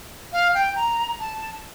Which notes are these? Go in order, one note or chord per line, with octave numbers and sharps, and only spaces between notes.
F5
G5
A#5
A5